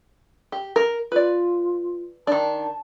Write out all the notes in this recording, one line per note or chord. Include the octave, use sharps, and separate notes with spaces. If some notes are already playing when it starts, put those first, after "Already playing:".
G4
A#4
F4 B4 D5
D#3 D4 A5